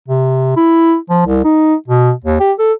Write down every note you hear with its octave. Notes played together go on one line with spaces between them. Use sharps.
C3
E4
F3
C2
D#4
B2
D#2
G4
A4